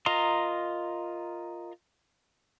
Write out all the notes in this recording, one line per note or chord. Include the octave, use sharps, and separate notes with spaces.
F4 A#4 D#5 A#5 C6